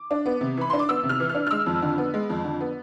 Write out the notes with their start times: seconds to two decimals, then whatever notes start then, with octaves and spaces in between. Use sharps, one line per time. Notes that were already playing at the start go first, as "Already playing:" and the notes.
Already playing: D6
0.11 D4
0.26 B3
0.41 C3
0.57 E3 B5
0.70 D4 C6
0.79 D6
0.89 B3 E6
1.03 C3
1.09 F6
1.20 E3
1.29 F6
1.35 D4
1.47 F6
1.51 G#3 E6
1.66 F2
1.82 D3
1.98 B3
2.14 G#3
2.30 F2
2.44 D3
2.61 B3